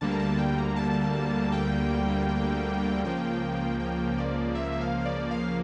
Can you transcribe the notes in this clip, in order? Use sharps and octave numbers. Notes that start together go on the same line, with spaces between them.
D2 D3 G3 A#3 A5
A#5
A5
G5
A#5
A5
G5
C#2 C#3 F3 A#3 G5
G5
D5
E5
F5
D5
F5